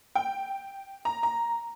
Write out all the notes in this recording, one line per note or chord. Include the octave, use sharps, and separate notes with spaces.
G5
A#5
A#5